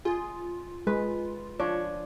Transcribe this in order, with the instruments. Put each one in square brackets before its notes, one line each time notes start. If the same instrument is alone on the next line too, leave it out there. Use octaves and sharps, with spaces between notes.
[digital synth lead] F4 [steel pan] G#4
[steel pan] G#3 [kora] B4
[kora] F3 D4 [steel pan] C#5